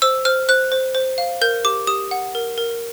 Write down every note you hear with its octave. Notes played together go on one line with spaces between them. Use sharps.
C5 E6
C5 F6
C5 F#6
C5
C5
F5
A#4 G6
G4 D6
G4 D#6
F#5
A#4
A#4